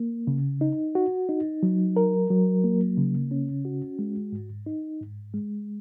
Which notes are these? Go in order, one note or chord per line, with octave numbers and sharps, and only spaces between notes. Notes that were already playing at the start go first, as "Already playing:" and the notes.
Already playing: A#3
C#3
D#4
F#4
D#4
F#3
A#4
F#3
A#3
C#3
C#4
F#4
G#3
G#2
D#4
G#2
G#3